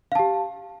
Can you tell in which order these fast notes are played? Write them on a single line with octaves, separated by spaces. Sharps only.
F5 A5 G4